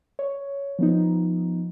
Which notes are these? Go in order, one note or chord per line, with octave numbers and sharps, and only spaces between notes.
C#5
F3 B3 D#4